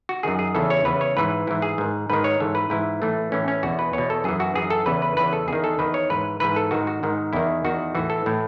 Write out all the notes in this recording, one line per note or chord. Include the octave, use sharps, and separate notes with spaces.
F#4
F#2 D#3 G#4
G#4
E2 C#3 E3 A4
C#5
E2 C#3 E3 B4
C#5
G#2 E3 B4
G#2 E3 E4
G#4
G#2 D#3
G#2 D#3 B4
C#5
G#2 E3 A4
B4
G#2 E3 E4
A2 E3 A3
A2 E3 C#4
C#4
E2 B2 F#4
B4
E2 B2 C#5
A4
F#2 E3 G#4
F#4
F#2 E3 G#4
A4
E2 C#3 E3 B4
B4
E2 C#3 E3 B4
A4
E2 D#3 G#4
A4
E2 D#3 B4
C#5
G#2 E3 B4
G#2 E3 B4
A4
G#2 D#3 F#4
F#4
G#2 D#3
E2 D#3 E4
E2 D#3 F#4
A2 E3 F#4
A4
A2 E3